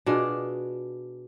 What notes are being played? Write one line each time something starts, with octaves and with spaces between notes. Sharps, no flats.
B2 D4 F4 G#4